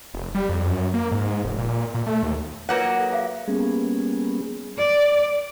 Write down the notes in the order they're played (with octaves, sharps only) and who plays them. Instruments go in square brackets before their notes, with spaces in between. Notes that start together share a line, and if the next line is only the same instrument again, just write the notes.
[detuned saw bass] F1
G3
F2
F#2
A#3
G#2
G#2
F1
A#2
A#2
A3
D#2
[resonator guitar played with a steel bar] F#3 A#3 F#5 [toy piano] F4 B4 C#5
[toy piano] A4
G#4 E5 F5
[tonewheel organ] G3 A#3 B3 C#4 G#4
[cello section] D5